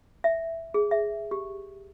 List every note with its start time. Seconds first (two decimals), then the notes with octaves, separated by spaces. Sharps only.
0.24 E5
0.74 G#4
0.91 E5
1.31 G4